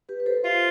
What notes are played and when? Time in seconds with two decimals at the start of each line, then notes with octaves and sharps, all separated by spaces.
0.09 G4 B4
0.20 B4
0.26 A4 C5
0.44 F4 C5 E5